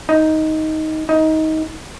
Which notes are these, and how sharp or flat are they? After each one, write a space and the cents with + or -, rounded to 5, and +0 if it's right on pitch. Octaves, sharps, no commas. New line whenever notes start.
D#4 +10
D#4 +20